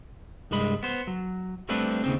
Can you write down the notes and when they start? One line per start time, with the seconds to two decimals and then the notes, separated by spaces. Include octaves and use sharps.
0.51 C2 G2 G#3 B5
0.83 B3 C5
1.07 F#3
1.69 G3 A3 C4 D4 B4
2.04 D#2 C#3 C4